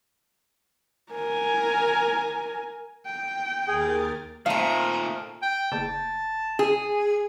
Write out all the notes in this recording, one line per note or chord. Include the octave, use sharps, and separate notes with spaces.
A#4 G#5
G5
D#2 G#4 A#4 A6
A#2 D#3 A3 C4 F5 A#5
G5
F#1 A5
G#4